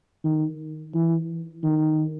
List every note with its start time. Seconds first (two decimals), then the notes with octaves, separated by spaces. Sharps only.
0.24 D#3
0.95 E3
1.64 D#3